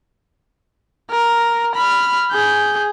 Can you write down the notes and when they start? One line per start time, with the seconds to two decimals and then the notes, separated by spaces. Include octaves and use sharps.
1.10 A#4
1.75 B5 F6
2.32 G#4 G6